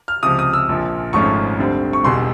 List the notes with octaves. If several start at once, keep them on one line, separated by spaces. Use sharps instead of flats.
F6
C#2 C3 F3 D#6
D#6
E6
A#1 A#2 F3
G#1 G#2 F3 A3 C#4 C#6
D2 D3 G3 C4
C#6
E1 E2 B2 G3 C6